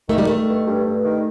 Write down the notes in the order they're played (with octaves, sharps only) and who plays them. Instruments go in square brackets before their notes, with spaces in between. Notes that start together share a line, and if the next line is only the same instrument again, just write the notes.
[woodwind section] D#3 [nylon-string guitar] A3
[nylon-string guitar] G3
[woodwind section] D#3 [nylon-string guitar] A3
[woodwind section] G2
G2
G2
D#3